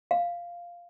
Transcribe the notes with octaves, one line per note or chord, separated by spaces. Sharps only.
F5